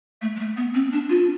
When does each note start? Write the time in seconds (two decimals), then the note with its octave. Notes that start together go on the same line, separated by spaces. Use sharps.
0.21 A3
0.35 G#3
0.39 A3
0.56 B3
0.74 C4
0.92 D4
1.09 F4